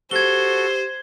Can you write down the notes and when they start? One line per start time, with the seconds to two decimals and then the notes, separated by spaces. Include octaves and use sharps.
0.11 F#4 G4 A4 C5 G#6 G7